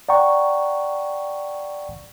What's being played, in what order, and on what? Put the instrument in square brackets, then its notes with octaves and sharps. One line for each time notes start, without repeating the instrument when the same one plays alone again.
[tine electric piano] D5 F#5 G5 A#5 C#6